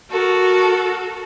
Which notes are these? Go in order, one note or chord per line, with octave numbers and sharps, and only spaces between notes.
F#4 A4 A#4